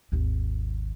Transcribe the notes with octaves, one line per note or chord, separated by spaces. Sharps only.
G#1 D#2